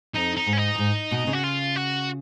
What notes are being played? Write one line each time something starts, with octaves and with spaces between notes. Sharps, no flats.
F2 D#4
D#4
G#2
C#4
D#4
F#2
G#2
B2
C#3
F#4
F4
F#4